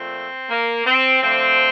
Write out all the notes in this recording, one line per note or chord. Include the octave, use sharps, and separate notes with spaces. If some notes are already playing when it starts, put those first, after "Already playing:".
Already playing: A#2 F3 A3 C4
A#3
C4
D3 F3 A3 C4